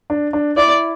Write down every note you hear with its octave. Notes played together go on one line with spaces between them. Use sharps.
D4
D4
E4 D5